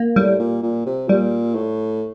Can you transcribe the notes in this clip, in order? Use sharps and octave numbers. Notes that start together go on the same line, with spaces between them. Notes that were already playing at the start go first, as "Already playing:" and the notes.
Already playing: A#3
A2 G3
A#2
A#2
C3
A#2 G3
A2